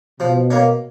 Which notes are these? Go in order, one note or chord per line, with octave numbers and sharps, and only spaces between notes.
B2 F3
A#3 C#4